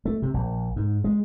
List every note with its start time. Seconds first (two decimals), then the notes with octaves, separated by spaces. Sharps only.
0.05 A3
0.22 C3
0.34 A#1
0.76 G#2
1.04 G#3